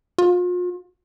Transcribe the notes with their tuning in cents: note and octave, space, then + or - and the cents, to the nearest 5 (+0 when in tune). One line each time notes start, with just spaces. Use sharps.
F4 +40